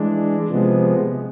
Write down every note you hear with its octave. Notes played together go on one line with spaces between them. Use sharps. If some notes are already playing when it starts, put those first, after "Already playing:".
Already playing: E3 G#3 D4
C3 F3 G#3 B3